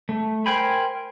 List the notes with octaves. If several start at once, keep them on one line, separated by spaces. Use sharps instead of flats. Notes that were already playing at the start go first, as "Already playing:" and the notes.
A3
A#4 C5 G5 G#5 B5